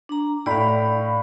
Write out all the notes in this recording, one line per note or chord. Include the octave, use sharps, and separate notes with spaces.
D4 A#5
A2 D5 F5 B5